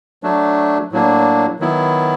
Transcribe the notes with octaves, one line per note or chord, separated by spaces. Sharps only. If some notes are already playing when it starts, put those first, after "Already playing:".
F#3 A3 D4
A2 F#3 A#3 D4
D#3 F#3 B3 E4